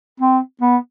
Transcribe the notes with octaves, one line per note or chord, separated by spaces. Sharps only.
C4
B3